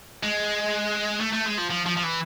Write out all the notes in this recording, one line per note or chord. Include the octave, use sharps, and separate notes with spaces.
G#3
A3
A3
G#3
F3
F3
F3
F3
E3